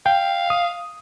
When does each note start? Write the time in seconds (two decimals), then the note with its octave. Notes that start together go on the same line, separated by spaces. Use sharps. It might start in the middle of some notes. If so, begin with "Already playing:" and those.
0.06 F5 G5
0.50 D#6